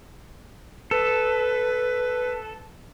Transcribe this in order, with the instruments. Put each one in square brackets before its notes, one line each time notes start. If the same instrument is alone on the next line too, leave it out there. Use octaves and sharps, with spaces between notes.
[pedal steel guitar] A4 [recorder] B4